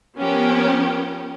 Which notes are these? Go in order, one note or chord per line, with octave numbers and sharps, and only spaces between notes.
F3 B3 C#4 G4 A#4